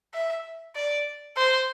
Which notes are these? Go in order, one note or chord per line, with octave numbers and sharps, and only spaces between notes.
E5
D5
C5